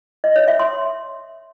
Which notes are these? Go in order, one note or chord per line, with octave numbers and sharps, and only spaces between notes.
D#5
C#5
E5
C6